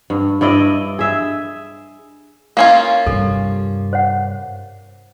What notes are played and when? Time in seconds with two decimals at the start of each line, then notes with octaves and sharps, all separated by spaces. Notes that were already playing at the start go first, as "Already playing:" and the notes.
0.10 G2
0.41 G2 E4 D5 D#5
0.99 G#4 E5
2.57 A#3 C#4 F4 F5
3.07 G2 C3 A4
3.93 C5 C#5 F#5